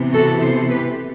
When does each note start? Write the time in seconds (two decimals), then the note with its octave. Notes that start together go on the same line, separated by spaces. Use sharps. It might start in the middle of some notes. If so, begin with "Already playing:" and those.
Already playing: C3 E3 B3
0.12 F#4 A4
0.40 A4 C5
0.69 G4 B4